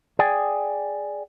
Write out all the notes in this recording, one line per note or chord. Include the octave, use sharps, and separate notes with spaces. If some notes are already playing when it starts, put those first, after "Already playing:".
G#4 D5 G5 G#5